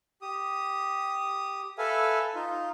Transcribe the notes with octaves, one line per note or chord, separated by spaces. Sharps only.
G4 D#6
A4 B4 E5 F5 G#5
D#4 F4